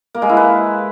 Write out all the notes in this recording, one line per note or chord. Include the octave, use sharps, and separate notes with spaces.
A#3
G#3
E4
B4